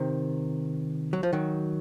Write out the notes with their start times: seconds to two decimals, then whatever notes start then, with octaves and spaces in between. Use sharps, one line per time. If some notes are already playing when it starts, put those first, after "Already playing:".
Already playing: C3 D#3
1.13 F#3
1.23 F3
1.33 D#3 F#3